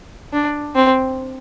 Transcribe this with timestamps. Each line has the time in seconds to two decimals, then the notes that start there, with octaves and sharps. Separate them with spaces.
0.33 D4
0.75 C4